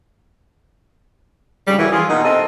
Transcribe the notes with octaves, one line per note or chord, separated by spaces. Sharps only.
G2 C#3 G3
F#2 C#3 E3
F3 F4 G#4
B2 A#3 D#4
C3 C4 A4 A#4 D#5